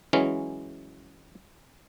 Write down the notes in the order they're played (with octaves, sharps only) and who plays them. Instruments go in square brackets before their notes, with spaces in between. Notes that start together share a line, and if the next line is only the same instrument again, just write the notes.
[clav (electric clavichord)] E3 F#3 G#3 C#4